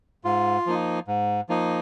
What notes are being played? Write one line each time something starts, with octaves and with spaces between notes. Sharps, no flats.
G#2 F4
F3 A#3 D#4
G#2
F3 A#3 D#4